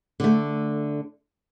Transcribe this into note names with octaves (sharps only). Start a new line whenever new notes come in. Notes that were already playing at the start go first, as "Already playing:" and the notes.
D3 A3